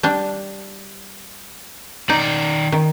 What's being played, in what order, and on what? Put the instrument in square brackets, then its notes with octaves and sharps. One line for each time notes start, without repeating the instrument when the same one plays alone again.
[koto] G3 D4
[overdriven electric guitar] D#3 D5 [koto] D#4
[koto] D#3